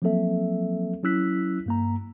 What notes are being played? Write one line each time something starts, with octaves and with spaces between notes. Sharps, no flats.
F3 F#3 A#3 C4 A4 E5
F#3 C#4 E4 E6 F#6 B6
G2 A#3 A#5